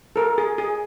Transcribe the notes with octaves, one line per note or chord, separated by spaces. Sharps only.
A4 A#4
G#4
G#4